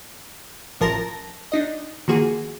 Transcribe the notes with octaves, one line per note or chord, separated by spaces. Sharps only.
A1 F3 A#4 A5 A#6
D4 D#4 D#5
D#3 F3 A#3 F#4 G#4